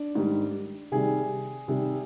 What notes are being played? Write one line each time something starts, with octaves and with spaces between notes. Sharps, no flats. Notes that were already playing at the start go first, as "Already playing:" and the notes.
Already playing: D4
G#2 D#3 G3
C3 D#3 G3 G#4
C3 D#3 G3